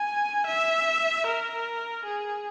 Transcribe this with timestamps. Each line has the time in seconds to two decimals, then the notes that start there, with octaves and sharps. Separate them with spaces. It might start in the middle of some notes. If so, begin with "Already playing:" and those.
Already playing: G#5
0.47 E5
1.27 A#4
2.05 G#4